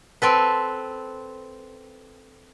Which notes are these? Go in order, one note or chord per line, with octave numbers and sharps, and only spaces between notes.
C4 A4 B4